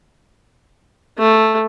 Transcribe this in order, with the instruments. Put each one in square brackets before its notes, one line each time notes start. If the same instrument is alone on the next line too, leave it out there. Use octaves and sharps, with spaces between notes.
[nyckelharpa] A3